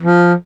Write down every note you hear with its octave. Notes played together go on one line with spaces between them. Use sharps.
F3